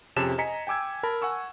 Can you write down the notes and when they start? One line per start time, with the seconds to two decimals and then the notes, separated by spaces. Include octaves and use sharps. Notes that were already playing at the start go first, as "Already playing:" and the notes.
0.16 F2 C3 C#4 G#4 A5 E7
0.38 D#5 G#5 A#5 B6 C#7
0.67 G5 G#5 D6 E6 G#6
1.03 A#4 A5 B5
1.22 F#5 G#5 C#6 E6